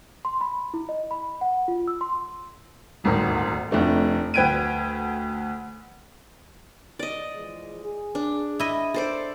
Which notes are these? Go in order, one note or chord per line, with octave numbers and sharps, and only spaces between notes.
C6
B5
E4
D#5
B5
F#5
F4
E6
C6
D#1 G#1 D2 G#2 D#3
F1 F2 A3 D4
D2 B4 G5 G#6 D7 D#7
D5 D#5
E3 F3 G#3
G#4
D4
E4 D#5
A4 C5 D5